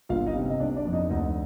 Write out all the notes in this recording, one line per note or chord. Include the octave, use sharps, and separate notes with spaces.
G1 F4 F5
D#4 D#5
C3
D#5
G1 D4 D5
D4 D5
F2
D#4 D#5
D2 D#4 D#5